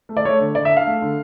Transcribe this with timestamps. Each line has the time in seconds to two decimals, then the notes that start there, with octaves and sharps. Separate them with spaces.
0.09 A3
0.17 D5
0.25 A3 C#5
0.40 D3
0.55 D3 D5
0.65 E5
0.70 D4
0.77 F5
0.87 A3
1.02 D3